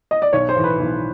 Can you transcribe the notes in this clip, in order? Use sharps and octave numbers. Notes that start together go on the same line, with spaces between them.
D#5
D5
B1 C#5
C5
A2 E3
B4
B1